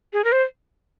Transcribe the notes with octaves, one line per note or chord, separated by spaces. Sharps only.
G#4
A#4
C5